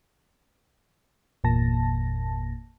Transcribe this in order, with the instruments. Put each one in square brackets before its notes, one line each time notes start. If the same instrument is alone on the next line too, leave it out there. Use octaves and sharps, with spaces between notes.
[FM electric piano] G1 E2 A#2 A#3 A5 A#6